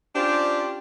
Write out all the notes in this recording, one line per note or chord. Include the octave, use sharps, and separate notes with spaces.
C#4 D4 F4 G4 C5 D5